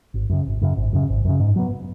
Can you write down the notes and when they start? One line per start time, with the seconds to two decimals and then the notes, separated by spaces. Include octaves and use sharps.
0.14 G#1
0.30 F#2 C#3
0.46 G#1
0.62 F#2 C#3
0.77 G#1
0.93 F#2 C#3
1.09 G#1
1.25 F#2 C#3
1.40 G#2
1.56 F#3 B3